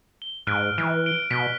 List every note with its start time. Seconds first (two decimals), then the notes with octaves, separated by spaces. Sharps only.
0.22 G7
0.47 G#2 F6 F#6 D7
0.78 E3
1.06 D7 G7
1.31 B2 B6